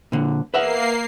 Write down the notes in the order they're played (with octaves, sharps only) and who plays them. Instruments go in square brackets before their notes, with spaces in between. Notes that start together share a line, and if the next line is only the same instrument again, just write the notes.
[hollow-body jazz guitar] A#2 D3
[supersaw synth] A#3 C7 [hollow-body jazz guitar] B4 E5 F#5